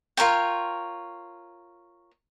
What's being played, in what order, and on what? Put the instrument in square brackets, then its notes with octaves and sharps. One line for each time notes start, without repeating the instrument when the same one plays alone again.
[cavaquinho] F4 A#4 C#5 G5